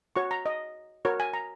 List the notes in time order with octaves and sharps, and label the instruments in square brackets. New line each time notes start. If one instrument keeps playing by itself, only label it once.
[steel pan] F#4 C#5 C#6
A#5
D#5
F#4 A#4 C#5
G#5
A#5